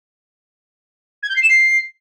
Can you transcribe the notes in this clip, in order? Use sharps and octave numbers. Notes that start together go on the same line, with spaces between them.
G#6
G6
C7
E7
C7